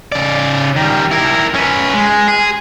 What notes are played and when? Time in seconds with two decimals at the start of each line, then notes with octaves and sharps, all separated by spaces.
0.12 C#3 D5
0.76 D#3 G3
1.11 E4 A#4
1.54 C#4 B4
1.94 G#3
2.28 G#4